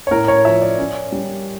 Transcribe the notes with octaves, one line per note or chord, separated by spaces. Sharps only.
C#5
A2 A#4
C#5
F3 E5
D5
C#4
G3